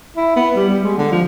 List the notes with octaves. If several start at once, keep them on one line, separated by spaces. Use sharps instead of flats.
E4
B3
G3
G3
G#3
D3
F3